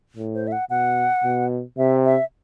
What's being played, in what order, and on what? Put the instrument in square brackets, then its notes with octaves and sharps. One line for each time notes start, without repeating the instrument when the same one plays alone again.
[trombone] A2
[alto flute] C5
E5
F#5
[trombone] B2 [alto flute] F#5
[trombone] B2
[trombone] C3 [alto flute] E5
[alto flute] E5